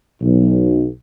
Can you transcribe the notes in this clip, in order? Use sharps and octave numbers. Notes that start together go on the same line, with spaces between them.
B1